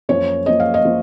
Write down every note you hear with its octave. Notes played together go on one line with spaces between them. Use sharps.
F#2 F3 A#3 C#5
F#2 F3 A#3 D#5
F5
D#5
F3 A#3